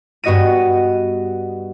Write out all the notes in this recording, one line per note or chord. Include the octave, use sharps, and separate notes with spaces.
G2 B3 F#4 D#5 A#6 D#7